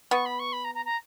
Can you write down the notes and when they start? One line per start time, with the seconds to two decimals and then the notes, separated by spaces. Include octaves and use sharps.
0.11 B3 C#6
0.25 B5
0.39 C#6
0.53 B5
0.64 A#5
0.75 A#5
0.85 A#5